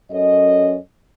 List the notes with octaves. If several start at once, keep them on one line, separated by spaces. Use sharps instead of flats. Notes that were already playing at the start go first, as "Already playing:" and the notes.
F#2 C#4 A4 D#5